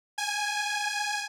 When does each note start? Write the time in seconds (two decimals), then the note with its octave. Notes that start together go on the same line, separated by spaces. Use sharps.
0.18 G#5